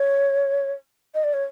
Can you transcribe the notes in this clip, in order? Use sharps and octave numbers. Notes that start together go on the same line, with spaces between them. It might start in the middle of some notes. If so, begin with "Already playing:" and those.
Already playing: C#5
D#5
D5
C#5